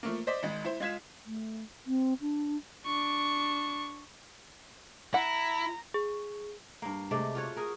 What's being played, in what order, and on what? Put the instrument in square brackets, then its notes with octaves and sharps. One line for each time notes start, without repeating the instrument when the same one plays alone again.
[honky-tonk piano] F3 A3 A#3
C5 D5 D#5 B6
G#1 G#3
E4 C5
G#3 F4 G#6 B6 E7
[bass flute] A3
C4
D4
[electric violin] D4 C#6
[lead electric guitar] E4 [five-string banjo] F#5 [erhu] A#5
[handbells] G#4
[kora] G2 A#3
C3 G#3 A3 D5
F4 F#4 C#5
G#4 A#4